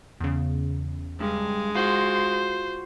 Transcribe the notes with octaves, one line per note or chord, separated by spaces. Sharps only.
E2 C#3
G2 G#3
F4 F#4 C5